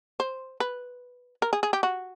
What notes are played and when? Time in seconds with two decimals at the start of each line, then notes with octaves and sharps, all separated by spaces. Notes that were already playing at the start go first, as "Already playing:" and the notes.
0.20 C5
0.60 B4
1.42 A#4
1.53 G#4
1.63 G#4
1.73 G4
1.83 F#4